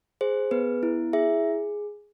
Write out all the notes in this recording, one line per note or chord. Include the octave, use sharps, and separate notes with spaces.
G#4 C5
B3 B4
E4
G#4 E5